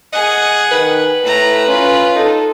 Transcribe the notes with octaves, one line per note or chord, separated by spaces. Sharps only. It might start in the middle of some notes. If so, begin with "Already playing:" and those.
G#4 D#5 F#5
D#3 B4
A2 A3 A#5
C#4 F4
D#4 A4